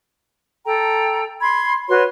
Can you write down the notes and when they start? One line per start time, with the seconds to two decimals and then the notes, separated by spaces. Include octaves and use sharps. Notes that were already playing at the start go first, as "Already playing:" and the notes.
0.65 A4 G5 A#5
1.41 B5 C6 G#6
1.88 F#4 B4 C#5 C6